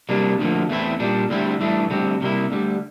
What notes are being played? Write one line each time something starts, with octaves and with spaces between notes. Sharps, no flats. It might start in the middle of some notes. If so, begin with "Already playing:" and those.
C3 G3 A#3 D4
D2 D3 F3 A#3
E2 E3 A3 C4 E4
A#2 G3 D4
D2 D3 G3 C4 E4
G2 E3 A3 D4
D2 D3 G3 C4
C3 G3 A#3 E4
D2 D3 G3